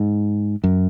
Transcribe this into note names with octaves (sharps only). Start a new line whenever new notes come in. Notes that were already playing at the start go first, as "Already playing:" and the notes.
Already playing: G#2
F#2